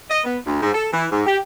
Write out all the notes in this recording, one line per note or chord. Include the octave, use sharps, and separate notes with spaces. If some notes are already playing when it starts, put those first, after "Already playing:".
D#5
B3
D2
G#2
A4
E3
G#2
G4